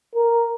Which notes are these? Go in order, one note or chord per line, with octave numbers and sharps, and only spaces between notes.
A#4